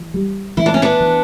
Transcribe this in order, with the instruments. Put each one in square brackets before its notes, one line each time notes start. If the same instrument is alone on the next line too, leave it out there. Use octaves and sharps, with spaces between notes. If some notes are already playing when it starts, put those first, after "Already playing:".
Already playing: [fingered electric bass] E3
G3
[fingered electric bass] E3 [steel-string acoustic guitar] E4
[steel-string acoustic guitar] D4
C#4
B3 D4
[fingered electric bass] E3